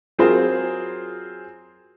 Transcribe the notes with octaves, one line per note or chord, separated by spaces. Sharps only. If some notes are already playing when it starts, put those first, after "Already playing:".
F#3 C4 F4 G#4 A#4 C5